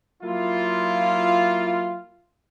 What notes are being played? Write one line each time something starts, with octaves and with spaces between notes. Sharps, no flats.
F#3 A#3 E4 F4